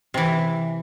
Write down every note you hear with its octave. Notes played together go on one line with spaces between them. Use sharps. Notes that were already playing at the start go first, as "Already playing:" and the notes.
C3 E3